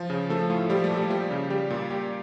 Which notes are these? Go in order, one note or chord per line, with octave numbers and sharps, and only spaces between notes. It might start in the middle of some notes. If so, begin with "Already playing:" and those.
Already playing: F3 F4
C#3
F3 A3 A4
A2 F4
F3 G3 G4
A3 A4
A#2
G3 G4
F3 G3 G4
C#3
G3 G4
A#2
G3 G4